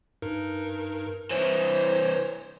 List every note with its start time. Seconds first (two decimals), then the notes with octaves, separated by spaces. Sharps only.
0.22 G2 D#4 A#4
1.31 C2 E3 C5 C#5